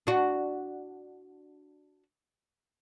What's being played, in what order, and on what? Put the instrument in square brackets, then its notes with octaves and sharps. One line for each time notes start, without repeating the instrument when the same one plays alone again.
[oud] D4 F#4